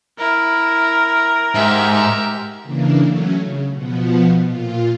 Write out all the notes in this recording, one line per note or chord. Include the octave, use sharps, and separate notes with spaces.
E4 A#4
G#2 G4 E5
C#3 E3 A#3 D4
F#3 A3 C#4
C#3
B2 F3 B3
A#2 F4